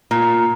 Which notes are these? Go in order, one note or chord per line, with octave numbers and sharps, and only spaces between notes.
A#2